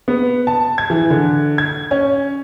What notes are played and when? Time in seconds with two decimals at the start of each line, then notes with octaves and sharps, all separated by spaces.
0.08 B3
0.47 A5
0.78 G#6
0.90 E3
1.10 D3
1.58 G#6
1.91 C#4